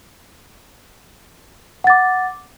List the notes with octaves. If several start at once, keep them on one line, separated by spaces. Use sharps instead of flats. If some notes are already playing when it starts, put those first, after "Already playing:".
F#5 D6 A6